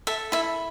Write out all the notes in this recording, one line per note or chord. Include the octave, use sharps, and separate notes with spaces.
A4 E5
E4 E5